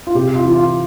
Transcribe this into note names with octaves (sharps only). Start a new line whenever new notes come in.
F4
C3 G4
F4
E3
F4